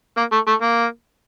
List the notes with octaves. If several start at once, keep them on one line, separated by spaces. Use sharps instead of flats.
A#3
A3
A3
A#3